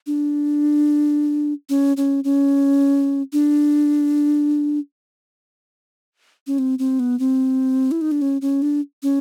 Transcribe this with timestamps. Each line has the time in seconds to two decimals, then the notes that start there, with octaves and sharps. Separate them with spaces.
0.07 D4
1.69 C#4
1.97 C#4
2.24 C#4
3.33 D4
6.47 C#4
6.58 C4
6.79 C4
6.99 B3
7.19 C4
7.91 E4
8.01 D#4
8.12 D4
8.22 C#4
8.42 C#4
8.62 D4
9.03 C#4